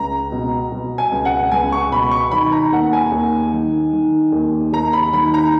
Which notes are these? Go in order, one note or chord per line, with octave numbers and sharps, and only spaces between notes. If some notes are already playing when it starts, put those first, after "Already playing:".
Already playing: C#2 A#5
B2
B2
G#5
C#2
F#5
C#2 G#5
C#6
B2 B5
C#6
D#3 B5
A#5
D#2 F#5
G#5
D#2
D#3
D#3
D#2
D#2 A#5
B5
D#3 B5
A#5